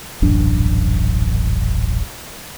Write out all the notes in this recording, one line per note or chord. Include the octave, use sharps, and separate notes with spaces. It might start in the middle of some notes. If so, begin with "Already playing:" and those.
D#1 A1 F#2 D4